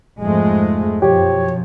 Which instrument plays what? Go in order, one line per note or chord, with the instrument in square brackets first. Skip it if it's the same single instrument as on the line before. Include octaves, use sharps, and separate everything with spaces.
[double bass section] F2 G#2 G#3 [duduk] A3
[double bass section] F#2 B2 F3 [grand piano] G4 [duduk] C#5